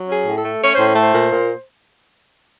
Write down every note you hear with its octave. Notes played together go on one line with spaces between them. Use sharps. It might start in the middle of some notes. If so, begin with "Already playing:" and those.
Already playing: F#3
C#4 G#4
A2
A4
A3
C#4 C#5
C5
A2
C5
A3
C5
A#2
A#2